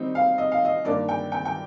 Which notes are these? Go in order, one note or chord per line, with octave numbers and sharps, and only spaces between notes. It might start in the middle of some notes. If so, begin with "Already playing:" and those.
Already playing: D#3 G3 C4 D#4
F5
D#5
F5
D#5
G2 D#3 A#3 D4 D5
G5
G5
G5